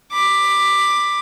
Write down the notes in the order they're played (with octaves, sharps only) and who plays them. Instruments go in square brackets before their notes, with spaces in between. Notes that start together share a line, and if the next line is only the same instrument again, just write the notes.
[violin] B5 D6